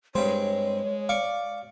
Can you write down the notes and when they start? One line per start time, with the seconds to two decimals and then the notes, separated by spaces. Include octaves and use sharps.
0.15 G2 G#3 C4 C5 C#5
1.09 D5 F5 C#6